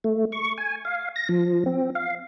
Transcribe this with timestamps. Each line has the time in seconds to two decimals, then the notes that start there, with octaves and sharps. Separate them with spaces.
0.04 A3
0.32 C#6
0.58 G#5
0.85 F5
1.16 A#6
1.29 F3
1.66 C4
1.95 F5